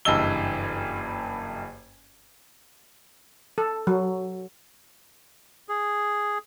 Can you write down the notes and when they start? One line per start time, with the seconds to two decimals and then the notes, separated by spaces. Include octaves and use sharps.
0.05 F#1 G2 E3 D#5 E6 G7
3.58 A4
3.87 F#3
5.68 G#4